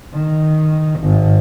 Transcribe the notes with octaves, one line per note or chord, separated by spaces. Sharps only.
D#3
G#1